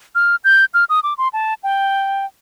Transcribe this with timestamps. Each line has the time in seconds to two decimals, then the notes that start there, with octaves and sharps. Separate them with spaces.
0.15 F6
0.44 G6
0.74 F6
0.89 D#6
1.03 D6
1.18 C6
1.33 A5
1.63 G5